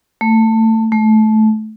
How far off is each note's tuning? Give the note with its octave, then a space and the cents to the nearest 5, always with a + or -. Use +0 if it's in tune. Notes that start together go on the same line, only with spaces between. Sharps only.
A3 +20
A3 -20